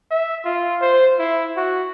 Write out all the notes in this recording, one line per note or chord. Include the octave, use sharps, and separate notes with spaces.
E5
F4
C5
E4
F#4